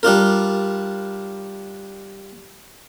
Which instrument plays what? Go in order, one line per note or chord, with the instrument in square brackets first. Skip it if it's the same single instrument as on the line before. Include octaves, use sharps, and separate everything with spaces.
[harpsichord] G3 D4 F4 A#4